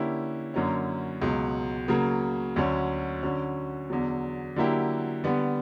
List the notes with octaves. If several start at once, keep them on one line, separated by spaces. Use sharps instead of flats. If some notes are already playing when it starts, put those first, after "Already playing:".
Already playing: D3 A#3 C#4 E4 G4
F#2 D3 F#3 A#3 C#4
C#2 B2 F#3
C#3 F#3 A#3
D2 D3 F#3 C#4
D3 F#3 C#4
E2 D3 F#3
D3 F#3 A#3 E4 G4
D3 G3 B3